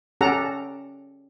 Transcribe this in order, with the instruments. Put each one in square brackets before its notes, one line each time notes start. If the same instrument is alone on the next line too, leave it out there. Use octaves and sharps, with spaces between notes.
[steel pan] C#4 G4 A4 F#5 A#5